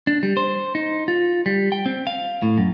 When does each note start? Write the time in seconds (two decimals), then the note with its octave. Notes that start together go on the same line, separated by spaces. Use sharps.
0.07 D4
0.23 G3
0.37 C5
0.75 D#4
1.08 F4
1.46 G3
1.72 G5
1.86 C4
2.07 F5
2.42 A2
2.58 F#2